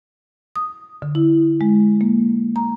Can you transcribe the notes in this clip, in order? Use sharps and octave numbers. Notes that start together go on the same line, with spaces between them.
D#6
D3
E4
G#3
A#3
A#5